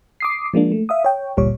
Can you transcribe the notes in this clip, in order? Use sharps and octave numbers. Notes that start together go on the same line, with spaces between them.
D6 D#6 C7
F3 G#3 A#3 D4
A3
E5 F5 D#6
C#5 G5
G1 D2 A#2 G3 C#5